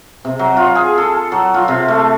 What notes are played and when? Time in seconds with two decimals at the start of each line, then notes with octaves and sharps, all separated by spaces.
0.25 C3
0.39 F#3
0.57 F4
0.75 G#4
0.98 A4
1.32 F#3
1.54 F4
1.68 C3
1.88 A3